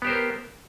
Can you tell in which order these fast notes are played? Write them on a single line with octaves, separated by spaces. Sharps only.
B3 G4 C5 A#4